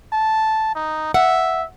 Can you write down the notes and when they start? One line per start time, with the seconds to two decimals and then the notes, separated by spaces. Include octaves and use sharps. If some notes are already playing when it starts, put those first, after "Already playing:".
0.12 A5
0.75 D#4
1.14 E5 F#5